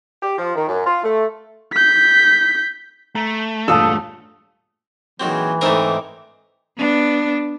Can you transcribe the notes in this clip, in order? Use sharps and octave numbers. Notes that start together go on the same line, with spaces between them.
G4
F3
D#3
F#2
F4
A3
G6 B6
A3 A#5
E1 G2 A#2 A4 F5 A5 D#6 E6
A#2 D#3 E3 F#3 C4 G#4
G#2 D3 A3 C4 D#4 E4 A#4 D6
B3 D4